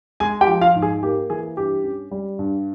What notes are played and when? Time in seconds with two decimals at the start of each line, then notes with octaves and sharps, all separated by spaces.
0.20 G#3 G#4 G#5
0.41 G4 G5
0.48 F3
0.61 F4 F5
0.75 G#2
0.82 G#4
1.03 A#3 G4
1.30 E3 G#4
1.57 G2 G4
1.84 C#4
2.11 G3
2.39 G2